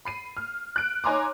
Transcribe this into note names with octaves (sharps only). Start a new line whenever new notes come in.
B5 C7 D#7
F6
F#6 D7
D#4 C#5 G#5 A#5 C6 D6